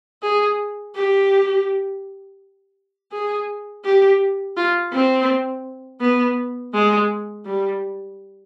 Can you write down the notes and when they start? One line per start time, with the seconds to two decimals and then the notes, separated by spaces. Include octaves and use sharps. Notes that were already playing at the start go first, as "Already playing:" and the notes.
0.23 G#4
0.95 G4
3.12 G#4
3.85 G4
4.57 F4
4.93 C4
6.01 B3
6.74 G#3
7.46 G3